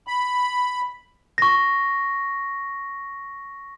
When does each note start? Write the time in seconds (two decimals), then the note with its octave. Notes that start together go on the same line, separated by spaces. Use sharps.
0.07 B5
1.38 C#6 A#6